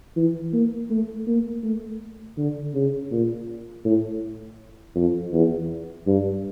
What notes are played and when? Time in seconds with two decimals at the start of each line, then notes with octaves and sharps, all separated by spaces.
0.16 E3
0.53 A#3
0.90 A3
1.27 A#3
1.64 A3
2.37 D3
2.74 C#3
3.11 A#2
3.85 A2
4.95 F2
5.32 E2
6.07 G2